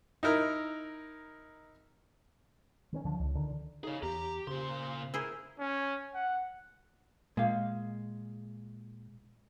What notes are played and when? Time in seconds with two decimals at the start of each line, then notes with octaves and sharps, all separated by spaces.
0.23 D#4 E4 A#4
2.93 D#3 B3 C#4
3.05 D2 D3 F3 D4
3.19 C#2
3.35 D3 D#3
3.84 D#4 G#4 C#5
4.03 E2 G4 A#5
4.47 A#2 C#3 C5 C6
5.14 E4 G#4 A#4 C5
5.59 C#4
6.14 F#5
7.37 A#2 G#3 F5